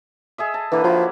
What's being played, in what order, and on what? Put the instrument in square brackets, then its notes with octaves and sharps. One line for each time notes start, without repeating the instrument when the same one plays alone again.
[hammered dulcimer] G#4 D#5 E5
A5
[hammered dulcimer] D3 A#3 B4 [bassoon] E3
[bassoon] F3 [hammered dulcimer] F#3 E4